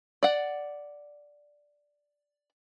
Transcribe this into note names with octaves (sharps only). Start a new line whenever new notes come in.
D5 F#5